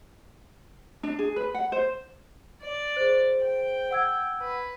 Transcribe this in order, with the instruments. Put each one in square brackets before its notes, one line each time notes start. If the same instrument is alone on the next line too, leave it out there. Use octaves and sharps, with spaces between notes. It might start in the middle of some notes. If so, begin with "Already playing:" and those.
[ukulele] D4
G#4
B4
F#5
C5
[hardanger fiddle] D5
[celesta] G#4 C5
[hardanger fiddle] G5
[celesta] F#5 E6 G#6
[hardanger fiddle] B4